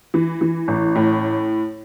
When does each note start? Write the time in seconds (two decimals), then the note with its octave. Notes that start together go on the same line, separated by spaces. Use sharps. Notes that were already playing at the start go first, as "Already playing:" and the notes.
0.14 E3
0.41 E3
0.68 A1
0.95 A2